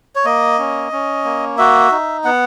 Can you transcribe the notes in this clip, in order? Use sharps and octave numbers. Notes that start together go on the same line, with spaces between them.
C#5
A#3 D#5
C#4
C#4
A#3
F#4 E5
D#4
B3 F#5